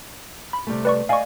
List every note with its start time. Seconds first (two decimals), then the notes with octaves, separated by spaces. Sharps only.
0.53 B5
0.67 C3 G3 A3
0.85 B4 D5 C#6
1.09 D5 D#5 F5 G#5 C#6